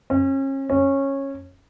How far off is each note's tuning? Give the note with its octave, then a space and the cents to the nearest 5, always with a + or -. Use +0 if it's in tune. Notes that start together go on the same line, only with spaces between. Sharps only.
C#4 -35
C#4 -15